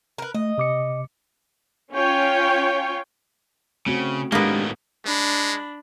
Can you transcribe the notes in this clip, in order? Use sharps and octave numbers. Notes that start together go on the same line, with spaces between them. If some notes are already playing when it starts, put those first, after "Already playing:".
A#4 B4
A3 D#5
C3 D6 C#7
C#4 F4 C#5 G5
C#3 A3 C4 F#4
A2 D#3 G#3 A#3 B3 D4 G4
G#3 D4 B5